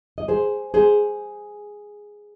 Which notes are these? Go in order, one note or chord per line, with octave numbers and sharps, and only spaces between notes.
D#5
G#4 C5
G#4 C5